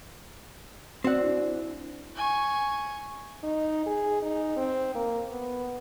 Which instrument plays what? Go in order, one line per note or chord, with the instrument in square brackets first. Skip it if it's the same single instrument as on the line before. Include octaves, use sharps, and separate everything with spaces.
[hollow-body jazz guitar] C4 F#5 [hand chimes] F#4 D5
[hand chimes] D4 E4
[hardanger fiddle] G#5 C#6
[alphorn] D#4
G#4
D#4
C4
A#3
B3